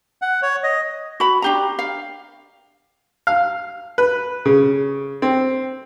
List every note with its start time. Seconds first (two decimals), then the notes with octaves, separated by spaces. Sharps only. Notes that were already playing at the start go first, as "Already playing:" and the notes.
0.22 F#5
0.42 C#5
0.63 D#5
1.20 F#4 B5
1.42 D4 G4 A#5
1.79 F5
3.27 F5
3.98 B4
4.45 C#3
5.22 C4